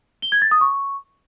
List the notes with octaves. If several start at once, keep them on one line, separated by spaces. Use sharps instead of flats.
G7
G#6
A6
D#6
C#6